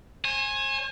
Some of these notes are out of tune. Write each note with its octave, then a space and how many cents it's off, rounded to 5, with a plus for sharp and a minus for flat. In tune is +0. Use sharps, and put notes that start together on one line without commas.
C5 +45 G#5 +0